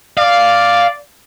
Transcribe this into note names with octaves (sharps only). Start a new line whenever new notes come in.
D5 F5